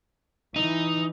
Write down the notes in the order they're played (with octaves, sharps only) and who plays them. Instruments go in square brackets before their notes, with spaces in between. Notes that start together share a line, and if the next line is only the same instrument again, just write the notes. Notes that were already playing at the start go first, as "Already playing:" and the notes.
[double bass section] E3 [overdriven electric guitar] D#4